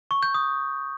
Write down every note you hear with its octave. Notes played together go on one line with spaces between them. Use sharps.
C#6
G6
D#6